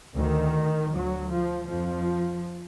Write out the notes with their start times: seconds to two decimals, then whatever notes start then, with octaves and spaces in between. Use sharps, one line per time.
0.15 D2 D#3
0.92 D2 F#3
1.30 F3
1.68 F2 F3